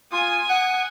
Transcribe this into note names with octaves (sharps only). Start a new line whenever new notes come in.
F4 G#5 D#6
F#5